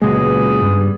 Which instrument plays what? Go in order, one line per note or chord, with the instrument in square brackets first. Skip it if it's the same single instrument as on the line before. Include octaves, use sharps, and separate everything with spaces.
[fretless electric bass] C#2 G#3 [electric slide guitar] A#2 F#3 [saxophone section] B3 G#4 B4
[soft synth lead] G2
[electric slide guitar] G3